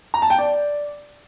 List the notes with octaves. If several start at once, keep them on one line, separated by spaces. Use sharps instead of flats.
A#5
A5
G5
D5